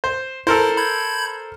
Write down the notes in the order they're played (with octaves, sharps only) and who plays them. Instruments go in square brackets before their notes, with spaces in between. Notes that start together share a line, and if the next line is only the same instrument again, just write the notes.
[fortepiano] C5
[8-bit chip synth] E4 [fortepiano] A4 A#4 C5
[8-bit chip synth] B5 G6 G#6